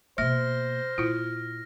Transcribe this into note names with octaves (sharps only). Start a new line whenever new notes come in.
B2 A#3 C5 E5 F6 A#6
A#2 E4 F4